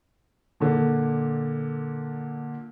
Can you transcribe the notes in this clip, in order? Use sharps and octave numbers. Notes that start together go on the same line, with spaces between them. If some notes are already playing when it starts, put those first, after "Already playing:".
A#2 D3